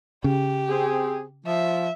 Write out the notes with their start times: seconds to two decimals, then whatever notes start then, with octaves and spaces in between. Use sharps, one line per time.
0.24 C#3 G4
0.69 C4 G#4
1.47 F3 E5